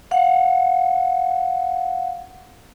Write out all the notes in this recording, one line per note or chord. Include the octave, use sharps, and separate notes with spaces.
F5 F#5